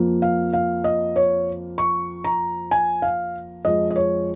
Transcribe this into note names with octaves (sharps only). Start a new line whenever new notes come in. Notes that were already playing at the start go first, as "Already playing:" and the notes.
Already playing: F2 F3 A#3
F5
F5
D#5
C#5
C#6
A#5
G#5
F5
F2 F3 G#3 D#5
D#5
C#5